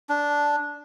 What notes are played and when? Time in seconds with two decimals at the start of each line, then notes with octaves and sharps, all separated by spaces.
0.09 D4